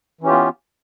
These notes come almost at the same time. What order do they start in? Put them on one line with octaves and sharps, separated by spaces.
E3 C#4 G4 F4 B3